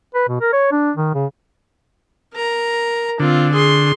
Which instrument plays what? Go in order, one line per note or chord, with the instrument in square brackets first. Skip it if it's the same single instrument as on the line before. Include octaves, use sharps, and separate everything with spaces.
[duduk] B4
B2
A#4
C#5
D4
D#3
C#3
[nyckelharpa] A#4 A#5
[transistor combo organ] D3 [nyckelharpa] C4 F4
[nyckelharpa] G#4 C6